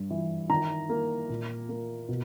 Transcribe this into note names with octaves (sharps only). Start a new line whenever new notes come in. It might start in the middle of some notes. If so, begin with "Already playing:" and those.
Already playing: G2
E3
D#3 A#5
A#3
A#2
A#3
B2